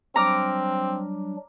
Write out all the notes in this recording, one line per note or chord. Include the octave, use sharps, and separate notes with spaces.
F#3 G3 C4 D4 A#5 D6 F6